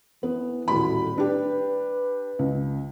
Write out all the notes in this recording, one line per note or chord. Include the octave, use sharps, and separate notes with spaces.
E3 B3
D#1 A2 F#4 B5
D4 G4 B4
C#2